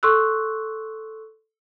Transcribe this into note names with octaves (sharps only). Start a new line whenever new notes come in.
A4 C6 C#6 E6 F#6